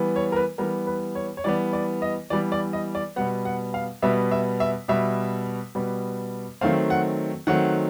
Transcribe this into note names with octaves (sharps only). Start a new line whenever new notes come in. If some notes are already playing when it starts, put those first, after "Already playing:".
Already playing: E3 G3 B3
C#5
A#4
B4
E3 G3 B3 A#4
B4
C#5
C#5
E3 G3 B3 D5
D5
D#5
E3 G3 B3 D5
D5
D#5
D5
B2 G3 B3 F#5
F#5
F5
B2 G3 B3 E5
E5
E5
B2 G3 B3 E5
B2 G3 B3
D#3 F#3 A3 C4 F5
F#5
D#3 F#3 A3 C4 F#5